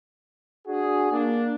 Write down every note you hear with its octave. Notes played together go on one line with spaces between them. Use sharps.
D4 F#4 G#4
A#3 D4